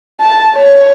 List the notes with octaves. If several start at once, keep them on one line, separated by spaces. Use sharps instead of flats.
A5
C#5